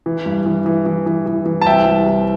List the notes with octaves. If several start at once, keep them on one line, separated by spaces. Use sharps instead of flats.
E3
G2
E3
E3
E3
E3
E3
E3
A5
C2 E5 G5
C2
C2